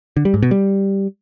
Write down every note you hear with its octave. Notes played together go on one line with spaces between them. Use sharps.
D3
G3
G#2
B2
G3